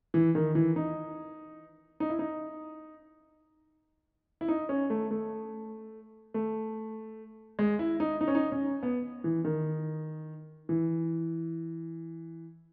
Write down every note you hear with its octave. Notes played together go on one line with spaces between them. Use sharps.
E3
D#3
E3
D#4
D#4
E4
D#4
E4
D#4
C#4
A3
A3
A3
G#3
E4
D#4
D#4
C#4
D#4
C#4
B3
E3
D#3
E3